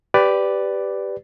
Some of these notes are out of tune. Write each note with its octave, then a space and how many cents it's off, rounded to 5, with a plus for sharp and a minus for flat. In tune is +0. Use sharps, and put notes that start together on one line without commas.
G4 +0 B4 +15 D5 +0